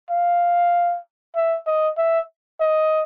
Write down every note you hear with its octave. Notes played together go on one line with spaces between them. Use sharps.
F5
E5
D#5
E5
D#5